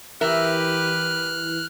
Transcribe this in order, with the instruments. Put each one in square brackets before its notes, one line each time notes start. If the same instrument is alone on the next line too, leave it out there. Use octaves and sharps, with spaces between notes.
[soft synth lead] E3 [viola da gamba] G4 B4 [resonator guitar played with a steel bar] A#4 E5 [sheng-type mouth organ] F6 F#6